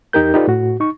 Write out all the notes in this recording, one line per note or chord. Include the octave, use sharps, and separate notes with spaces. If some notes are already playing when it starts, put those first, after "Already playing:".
E2 D#4 G4 A#4 G6
D#4 F4 G4 A4 B4 D5
A2 F#4
D#4 C#6